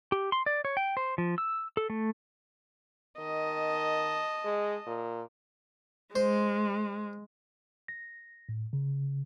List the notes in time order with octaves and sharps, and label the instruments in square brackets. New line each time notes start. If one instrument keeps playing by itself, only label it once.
[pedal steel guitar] G4
C6
D5
C#5
G5
C5
F3
E6
A4
A3
[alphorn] D#3 [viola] D#5 A5
[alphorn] G#3
A#2
[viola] G#3 [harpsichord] C5
[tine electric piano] A#6
A2
C#3